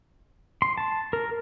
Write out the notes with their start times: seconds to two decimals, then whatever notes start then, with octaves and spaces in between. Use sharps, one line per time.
0.62 C6
0.78 A5
1.13 A#4